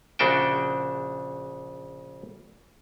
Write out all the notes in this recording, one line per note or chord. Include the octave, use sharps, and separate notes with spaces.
A#1 C#3 D4 F#4 E5 G5